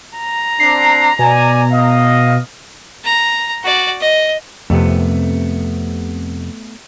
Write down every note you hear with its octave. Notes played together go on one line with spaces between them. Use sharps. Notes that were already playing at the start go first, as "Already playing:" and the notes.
A#5
C4 D4 C7
B2 D5 G#5
D#5 F5
A#5
F#4 D5
D#5
F2 C3 A3 B3